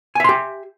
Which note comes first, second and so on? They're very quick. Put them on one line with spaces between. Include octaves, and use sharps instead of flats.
G#5 E5 C6 G4